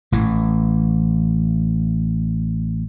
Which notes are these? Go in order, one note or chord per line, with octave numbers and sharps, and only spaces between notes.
A1 E3